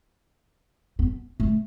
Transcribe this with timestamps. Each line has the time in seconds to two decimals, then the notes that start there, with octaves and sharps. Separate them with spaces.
0.99 B3
1.40 A3